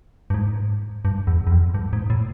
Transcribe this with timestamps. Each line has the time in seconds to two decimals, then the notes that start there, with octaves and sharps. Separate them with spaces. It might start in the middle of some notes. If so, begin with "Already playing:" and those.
0.30 G2
0.34 G#2
1.05 G2
1.27 E2
1.47 E2
1.51 F2
1.74 G2
1.93 G#2
2.10 A2